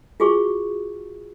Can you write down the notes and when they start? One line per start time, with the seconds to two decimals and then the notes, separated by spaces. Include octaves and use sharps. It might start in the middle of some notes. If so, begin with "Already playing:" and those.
0.20 F4 F#4 G#4 C5 C#6